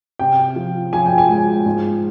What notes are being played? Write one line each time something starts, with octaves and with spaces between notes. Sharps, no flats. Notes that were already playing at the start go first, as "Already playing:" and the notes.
C3 G5
F3
F3 G#5
G5
G#5
G#3
G#2